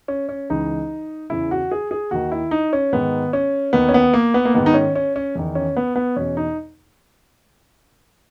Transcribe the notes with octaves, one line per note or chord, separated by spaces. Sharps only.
C#4
C#4
C#2 C#3 E3 D#4
E2 C#3 E3 E4
F#4
G#4
G#4
D#2 D#3 F#4
E4
D#4
C#4
G#2 D#3 B3
C#4
D#2 D#3 B3
C#4
B3
A#3
B3
A#3
G#2 D#3 B3
D#4
C#4
C#4
C#4
E2 D#3
C#4
B3
B3
E2 B2 C#4
D#4